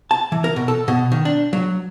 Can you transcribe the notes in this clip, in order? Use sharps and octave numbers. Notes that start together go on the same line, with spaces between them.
A5
E3
A#4
B2
A4
B2
D#3
D4
F#3